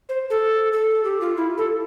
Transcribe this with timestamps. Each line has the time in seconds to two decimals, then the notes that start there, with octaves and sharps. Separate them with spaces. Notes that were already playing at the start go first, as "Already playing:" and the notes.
0.09 C5
0.30 A4
0.72 A4
1.04 G4
1.21 F4
1.37 E4
1.58 A4